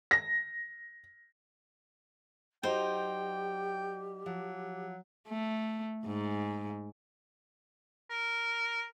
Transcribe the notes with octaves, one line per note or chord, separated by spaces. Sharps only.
A#6
F#3 D#4 G4 C5 D5 G5
F3 F#3
A3
G#2
A#4